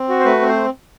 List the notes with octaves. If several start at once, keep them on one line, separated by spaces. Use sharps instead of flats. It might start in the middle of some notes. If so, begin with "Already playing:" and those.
Already playing: C4
F#4
C5
A3 B4
C4
C5